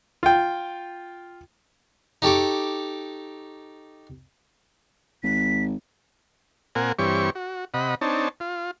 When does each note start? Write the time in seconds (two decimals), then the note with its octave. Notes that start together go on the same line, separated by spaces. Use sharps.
0.23 F4 G5
2.22 D#4 G4 A4 C#6 D6
5.24 G#1 B6
6.75 A#2 C4 A#4 F#5 G#5
6.99 G2 E3 C4 G4 C#5 C#6
7.35 F#4
7.74 C3 D#5 F#5 B5
8.01 C4 D4 D#4 C#5 A5
8.40 F4